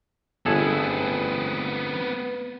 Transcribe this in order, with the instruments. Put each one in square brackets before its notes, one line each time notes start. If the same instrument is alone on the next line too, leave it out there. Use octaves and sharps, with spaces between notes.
[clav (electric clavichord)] G1 G#4 A4 [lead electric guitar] B3 C4